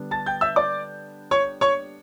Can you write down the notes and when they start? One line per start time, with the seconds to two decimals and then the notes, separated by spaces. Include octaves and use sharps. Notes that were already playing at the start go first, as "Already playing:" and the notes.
Already playing: D3 G3 B3 D4
0.11 A5 A6
0.26 G5 G6
0.41 E5 E6
0.56 D5 D6
1.31 C#5 C#6
1.61 C#5 C#6